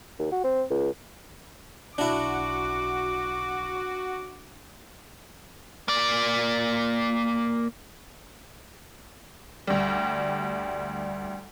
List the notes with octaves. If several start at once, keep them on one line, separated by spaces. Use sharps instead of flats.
D#2
F#4
C4
C#2
B1 D4 E4 F#4 D6
A#3 D5
D2 G3